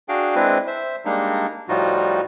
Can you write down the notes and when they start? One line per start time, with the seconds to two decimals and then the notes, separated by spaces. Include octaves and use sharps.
0.09 D4 F#4 G#4 F5 G5
0.35 G#3 C4 D4 E4 B4
0.67 C5 E5
1.05 G3 G#3 A#3 D4 D#4
1.69 A2 F3 G3 D#4 F4 F#4